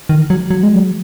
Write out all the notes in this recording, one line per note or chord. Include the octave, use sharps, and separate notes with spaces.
D#3
F#3
F#3
G#3
F#3